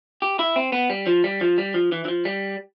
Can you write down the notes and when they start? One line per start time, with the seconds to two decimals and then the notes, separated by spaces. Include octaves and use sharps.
0.22 G4
0.39 E4
0.56 C4
0.72 B3
0.90 G3
1.07 F3
1.24 G3
1.41 F3
1.58 G3
1.74 F3
1.92 E3
2.05 E3
2.08 F3
2.25 G3